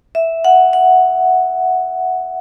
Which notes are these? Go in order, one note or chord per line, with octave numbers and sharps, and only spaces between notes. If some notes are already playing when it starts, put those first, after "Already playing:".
E5
F#5
F#5